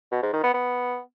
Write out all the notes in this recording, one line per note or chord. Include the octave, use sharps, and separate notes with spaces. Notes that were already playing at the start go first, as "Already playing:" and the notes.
B2
G#2
D#3
B3
B3